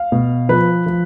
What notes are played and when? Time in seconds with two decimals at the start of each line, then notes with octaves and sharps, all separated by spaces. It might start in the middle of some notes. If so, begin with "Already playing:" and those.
Already playing: F5
0.12 B2
0.49 F3 B4
0.86 F3